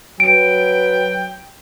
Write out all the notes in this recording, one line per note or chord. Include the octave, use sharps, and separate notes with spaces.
F#3 B4 G5 D7